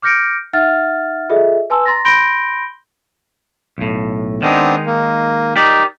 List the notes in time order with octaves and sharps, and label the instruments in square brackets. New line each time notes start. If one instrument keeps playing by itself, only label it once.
[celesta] D6 F6 G6 A#6 C#7 D7
D#4 E5 F#5 F6 A6
F4 G#4 A4 D#5 E5
B4 G#5 A5 C6 E6
A#5 C6 A6 A#6
B5 C6 G6 A#6 D7 G7
[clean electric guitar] B1 A2
[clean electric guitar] D#3 G#3 D#4 [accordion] B3 C4 D4
[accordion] A#3
[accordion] D#4 [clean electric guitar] G4 A#4 D5